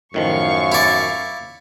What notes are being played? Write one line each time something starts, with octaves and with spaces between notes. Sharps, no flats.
F#2 A2 D#3 F3 F5 C#6
E4 D5